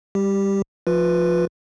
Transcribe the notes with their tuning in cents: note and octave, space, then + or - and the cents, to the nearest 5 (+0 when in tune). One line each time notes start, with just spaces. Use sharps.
G3 +20 G4 +0
F3 +0 F4 +30 B4 +0